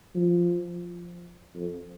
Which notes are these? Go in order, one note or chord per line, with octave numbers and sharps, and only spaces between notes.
F3
F2